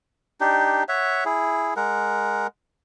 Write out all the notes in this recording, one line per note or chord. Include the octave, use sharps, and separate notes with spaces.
D4 D#4 G4
C#5 E5 F#5
E4 G#4
G#3 A#4 F#5